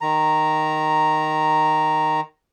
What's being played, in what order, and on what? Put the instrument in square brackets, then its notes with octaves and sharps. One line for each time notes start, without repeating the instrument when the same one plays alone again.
[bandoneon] D#3 A#5